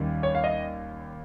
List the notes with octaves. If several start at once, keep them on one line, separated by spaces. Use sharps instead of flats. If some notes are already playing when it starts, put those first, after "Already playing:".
Already playing: D#2 D#3 G3 C#4
C#5
F5
D#5